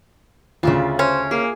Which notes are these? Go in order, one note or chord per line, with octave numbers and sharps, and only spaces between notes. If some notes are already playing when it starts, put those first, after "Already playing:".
D2 C#3 F4 A4 E5
C#4 C5
A#3 G#4